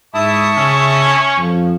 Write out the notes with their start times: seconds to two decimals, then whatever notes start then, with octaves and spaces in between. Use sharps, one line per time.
0.14 G#2 E4 E5 A5 C#6 D#6
0.57 C#3 C#4
1.38 F2 F3